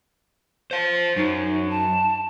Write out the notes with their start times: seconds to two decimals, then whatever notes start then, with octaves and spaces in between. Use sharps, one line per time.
0.71 C5 F5
1.16 F#2 D#4
1.70 A5